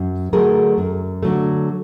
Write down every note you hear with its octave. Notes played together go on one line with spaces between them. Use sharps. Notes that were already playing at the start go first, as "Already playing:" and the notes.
Already playing: F#2
D3 F#3 A3 G#4 A#4
F#2
D3 F#3 A3